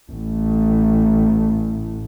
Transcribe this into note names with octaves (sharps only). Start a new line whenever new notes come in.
A1 A2